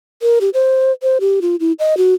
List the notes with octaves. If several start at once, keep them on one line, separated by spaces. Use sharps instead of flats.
A#4
G4
C5
C5
G4
F4
E4
D#5
F#4